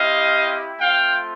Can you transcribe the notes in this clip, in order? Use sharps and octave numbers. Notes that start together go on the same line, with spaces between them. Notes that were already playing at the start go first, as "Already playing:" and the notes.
Already playing: C4 E4 G4 D#5 F5
A3 C4 F4 F5 G5